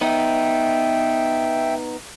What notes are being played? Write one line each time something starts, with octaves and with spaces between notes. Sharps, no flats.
B3 D#4 E5 G5